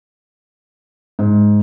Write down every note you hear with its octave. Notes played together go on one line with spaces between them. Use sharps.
G#2